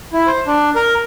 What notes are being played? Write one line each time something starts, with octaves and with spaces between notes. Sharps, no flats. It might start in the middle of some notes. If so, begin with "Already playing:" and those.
E4
C5
D4
A#4